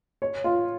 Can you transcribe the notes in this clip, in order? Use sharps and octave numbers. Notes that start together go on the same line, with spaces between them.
C#5
F4